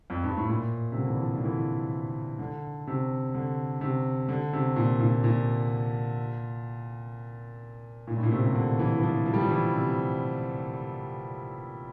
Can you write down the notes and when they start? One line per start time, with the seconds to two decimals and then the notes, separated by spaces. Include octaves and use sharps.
0.10 F2
0.24 G2
0.37 A2
0.49 A#2
0.92 C3
0.98 D3
1.09 E3
1.22 F3
1.37 D3
1.44 E3
2.39 D3
2.87 C3
3.34 D3
3.81 C3
4.29 D3
4.53 C3
4.76 A#2
5.00 A#2
5.24 A#2
8.07 A#2
8.17 A2
8.23 A#2
8.31 C3
8.44 C3
8.55 D3
8.79 E3
8.99 E3
9.03 F3
9.26 F3
9.34 G3
9.41 F3
9.49 E3
9.74 C3